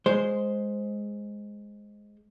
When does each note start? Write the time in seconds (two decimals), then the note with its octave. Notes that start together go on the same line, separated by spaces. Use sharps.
0.06 G#3 C5